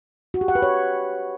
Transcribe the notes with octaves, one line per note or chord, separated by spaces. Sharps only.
F#4
G4
F#5
B4
C#5